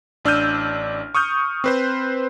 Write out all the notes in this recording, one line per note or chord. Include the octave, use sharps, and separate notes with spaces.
A1 D4 E6 F6 G6 D#7
C#6 D#6 F6 G6
C4 B4 C5